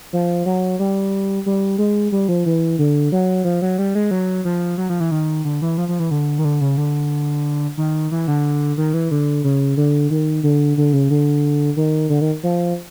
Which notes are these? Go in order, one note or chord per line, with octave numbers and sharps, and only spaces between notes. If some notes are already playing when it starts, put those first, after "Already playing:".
F3
F#3
G3
G3
G#3
G3
F3
E3
D3
F#3
F3
F#3
G3
G#3
F#3
F3
F#3
F3
E3
D#3
D3
E3
F3
F3
E3
D3
D#3
D3
C#3
D3
D#3
E3
D3
D#3
E3
D3
C#3
D3
D#3
D3
D3
C#3
D3
D#3
D3
D#3
F3